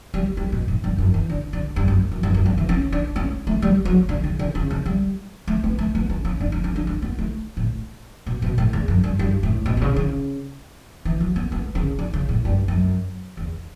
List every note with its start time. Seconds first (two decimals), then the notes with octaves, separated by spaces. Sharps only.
0.14 G3
0.37 G3
0.52 B2
0.68 A2
0.84 G2
0.98 F#2
1.14 E3
1.29 D3
1.53 D3
1.76 G2
1.88 F#2
2.12 F#2
2.23 G2
2.34 F#2
2.46 G2
2.58 E3
2.69 C#4
2.92 D4
3.16 C#4
3.47 A3
3.62 G3
3.85 F#3
4.09 D3
4.24 C#3
4.39 D3
4.55 C#3
4.71 C#3
4.86 G3
5.48 A3
5.64 B3
5.79 A3
5.95 B3
6.10 C#4
6.25 C#4
6.40 D4
6.52 C#4
6.64 C#4
6.76 D4
6.87 C#4
7.02 B3
7.19 A3
7.57 A2
8.26 B2
8.42 B2
8.58 A2
8.73 E2
8.88 F#2
9.04 G2
9.19 G2
9.43 A2
9.66 B2
9.77 B2
9.81 C#3
9.96 C#3
11.05 E3
11.21 F#3
11.36 B3
11.52 B3
11.75 C#3
11.99 D3
12.13 C#3
12.29 A2
12.45 G2
12.68 F#2
13.37 E2